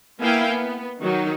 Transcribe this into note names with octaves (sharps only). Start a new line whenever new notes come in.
A#3 B3 E4 F5 G5 G#5
B3
D#3 F#3 D#4